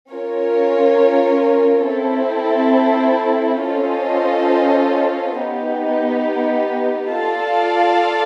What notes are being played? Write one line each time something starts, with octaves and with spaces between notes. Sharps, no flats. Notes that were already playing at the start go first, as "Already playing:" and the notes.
C#4 F4 A#4 C#5
C4 E4 A4
C#4 F4 A4 C5 D#5
B3 D#4 G4
F4 A4 D5 F5 A5